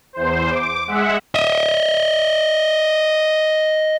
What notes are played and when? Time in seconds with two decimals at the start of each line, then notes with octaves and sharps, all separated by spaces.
0.13 E2 C5
0.50 D6
0.87 G#3 E5 F#5
1.35 D#5 E5